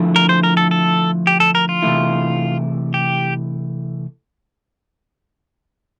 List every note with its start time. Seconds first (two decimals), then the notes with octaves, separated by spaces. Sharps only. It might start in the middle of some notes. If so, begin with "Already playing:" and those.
Already playing: D3 F3 A3 E4
0.16 A#4
0.29 C5
0.43 A#4
0.57 A4
0.71 A4
1.27 G4
1.40 A4
1.55 A#4
1.69 F4
1.82 C3 E3 A3 E4
2.94 G4